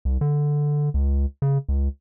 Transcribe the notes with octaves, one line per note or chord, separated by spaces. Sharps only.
C2
D3
C#2
C#3
C#2